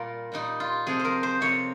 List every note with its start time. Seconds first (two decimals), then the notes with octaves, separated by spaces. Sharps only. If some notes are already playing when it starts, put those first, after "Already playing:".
Already playing: A#2 G3 F4 A#4
0.32 A#2 G3 D#4
0.60 F4
0.87 F2 C3 F3 G#4
1.00 C5
1.05 A#4
1.23 C5
1.41 F2 C3 F3 C#5